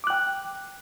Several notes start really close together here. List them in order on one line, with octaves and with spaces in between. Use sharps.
D6 F#6 G5